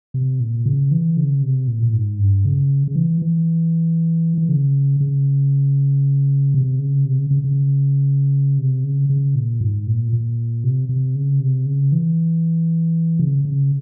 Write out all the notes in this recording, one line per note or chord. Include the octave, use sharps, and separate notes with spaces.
C3
A#2
C#3
E3
C#3
C3
A#2
A#2
G#2
G2
C#3
C#3
E3
E3
E3
C#3
C#3
C3
C#3
C3
C#3
C#3
C#3
C3
C#3
C#3
A#2
G#2
A#2
A#2
C3
C3
C#3
C3
C#3
E3
C#3
C#3